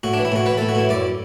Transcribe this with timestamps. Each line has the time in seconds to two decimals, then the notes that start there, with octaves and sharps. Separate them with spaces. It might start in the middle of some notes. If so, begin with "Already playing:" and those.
0.03 A2 F#4
0.13 D4
0.18 E3
0.25 E4
0.32 A2 F#4
0.46 E3 B4
0.58 A4
0.61 A2
0.69 F#4
0.75 A2 E4
0.89 F#2 D5